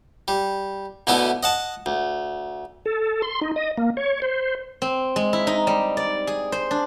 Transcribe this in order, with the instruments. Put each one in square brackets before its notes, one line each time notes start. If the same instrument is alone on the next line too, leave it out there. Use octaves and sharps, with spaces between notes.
[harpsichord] G3
D2 B2 D3 B3 E4 A4
D#5 F#5 A5
D2
[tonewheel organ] A4
C6
D#4
D#5
A#3
C#5
C5
[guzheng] C4
G#3
E4
D#4
G3
D5
G#4
C5
D4